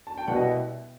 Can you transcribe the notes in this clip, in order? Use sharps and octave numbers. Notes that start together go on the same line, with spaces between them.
A5
G5
C2 B2 G3 B3 F#5
D#5
E5